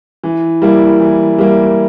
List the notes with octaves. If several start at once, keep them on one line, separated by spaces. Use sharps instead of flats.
E3
G3 A#3 E4
E3
G3 A#3 E4